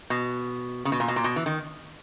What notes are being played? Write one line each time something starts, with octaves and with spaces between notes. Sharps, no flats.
B2
C#3
B2
A#2
B2
A#2
B2
E3
D#3